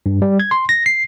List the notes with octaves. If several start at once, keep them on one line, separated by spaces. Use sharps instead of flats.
G2
G3
G#6
C6
A#6
C7